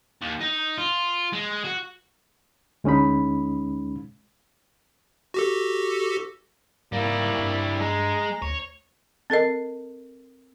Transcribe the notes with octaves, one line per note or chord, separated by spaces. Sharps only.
D#2
D#4
F4
G#3
F#4
D2 G#3 C#4 D#4 B5
F#4 G4 A4
G#2 G3 A#3 E4
G2
G#3 A#5
D2 C#5
C4 A4 A#4 D#5